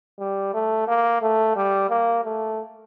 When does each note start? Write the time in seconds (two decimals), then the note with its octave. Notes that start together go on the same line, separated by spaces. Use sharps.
0.19 G3
0.54 A3
0.88 A#3
1.22 A3
1.56 G3
1.90 A#3
2.24 A3